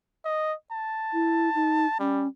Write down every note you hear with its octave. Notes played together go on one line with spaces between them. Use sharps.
D#5
A5
E4
D#4
G3 C#4